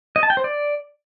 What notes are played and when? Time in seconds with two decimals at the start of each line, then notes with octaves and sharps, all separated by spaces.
0.16 D#5
0.23 A5
0.30 G5
0.37 C5
0.44 D5